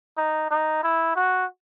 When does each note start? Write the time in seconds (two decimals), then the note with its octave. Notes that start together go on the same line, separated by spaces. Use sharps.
0.17 D#4
0.50 D#4
0.83 E4
1.16 F#4